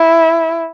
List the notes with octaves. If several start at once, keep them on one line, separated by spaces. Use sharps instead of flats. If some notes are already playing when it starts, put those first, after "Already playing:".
Already playing: E4